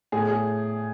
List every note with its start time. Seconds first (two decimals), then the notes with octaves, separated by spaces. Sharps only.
0.12 A2 G#4
0.29 G#4